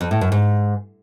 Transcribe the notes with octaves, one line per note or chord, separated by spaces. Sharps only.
F2
A2
F#2
G#2